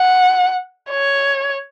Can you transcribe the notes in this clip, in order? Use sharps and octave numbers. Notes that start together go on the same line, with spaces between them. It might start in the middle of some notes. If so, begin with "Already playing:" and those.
Already playing: F#5
C#5